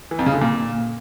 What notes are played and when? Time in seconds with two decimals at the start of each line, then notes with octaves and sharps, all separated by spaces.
0.11 E3
0.19 F2
0.26 C#3
0.34 D3
0.41 A#2